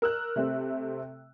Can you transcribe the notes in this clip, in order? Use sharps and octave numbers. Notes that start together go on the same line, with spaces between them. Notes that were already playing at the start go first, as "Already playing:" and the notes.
A#4 E6 F#6
C3 A3 C4